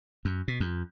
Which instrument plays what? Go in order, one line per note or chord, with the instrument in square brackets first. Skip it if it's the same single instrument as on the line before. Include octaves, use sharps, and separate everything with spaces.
[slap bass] F#2
B2
F2